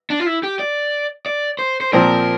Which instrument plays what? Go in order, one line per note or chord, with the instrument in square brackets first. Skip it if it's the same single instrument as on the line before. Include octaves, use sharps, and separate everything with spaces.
[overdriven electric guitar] D4
F4
E4
G4
D5
D5
C5
C5
[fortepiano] A#2 F3 C4 [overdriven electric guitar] A#4